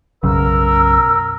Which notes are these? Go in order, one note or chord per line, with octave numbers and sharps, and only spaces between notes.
B1 F#2 C#3 A#4 E6